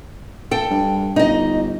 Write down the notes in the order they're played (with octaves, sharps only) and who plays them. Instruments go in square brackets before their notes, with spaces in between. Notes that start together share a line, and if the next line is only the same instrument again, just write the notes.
[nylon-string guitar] A4 G5
[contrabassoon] G2
[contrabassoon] G1 [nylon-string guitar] D#4 D#5